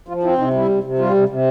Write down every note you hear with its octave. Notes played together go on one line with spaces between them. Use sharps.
F3 F4
C4 E4
C3 D#4
G3 E4
C3
C3
G3 F4
C3
C3